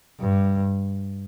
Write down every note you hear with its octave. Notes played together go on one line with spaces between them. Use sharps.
G2